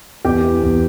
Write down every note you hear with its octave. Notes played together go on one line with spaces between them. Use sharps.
E2 G4
E3
E2